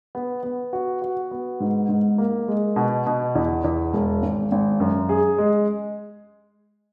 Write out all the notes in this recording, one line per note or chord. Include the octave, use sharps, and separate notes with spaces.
B3
B3
F#4
F#4
B3
G#2
G#2
A#3
G#3
B2
B2
E2
E2
E1
G#1
G#1
F#2
G#4
G#3